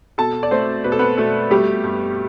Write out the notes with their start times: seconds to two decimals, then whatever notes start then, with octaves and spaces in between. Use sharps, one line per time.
0.18 B2 A4 A5
0.43 D5
0.51 A3 C4 C5
0.84 B2 B4
0.92 A4
0.99 B3 B4
1.18 B2 A3 A4
1.50 G3 A3 G4
1.84 G2